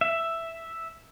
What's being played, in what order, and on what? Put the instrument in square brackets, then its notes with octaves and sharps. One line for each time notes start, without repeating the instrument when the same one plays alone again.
[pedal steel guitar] E5